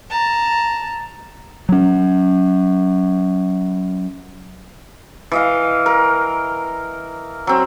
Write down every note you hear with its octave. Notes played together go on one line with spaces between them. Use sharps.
A5 A#5
F#3 C#4
E3 D#5 F5
A#4
F#3 C4